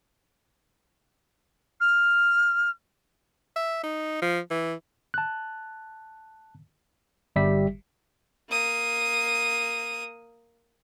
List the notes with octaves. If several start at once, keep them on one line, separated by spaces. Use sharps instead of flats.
F6
E5
D#4
F3
E3
A5 F#6
G1 G3 G4 E5 B6
A#3 D#6